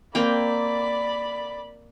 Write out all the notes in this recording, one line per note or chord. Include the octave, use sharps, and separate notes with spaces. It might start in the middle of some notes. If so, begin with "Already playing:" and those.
A#3 C4 D5 G5 B5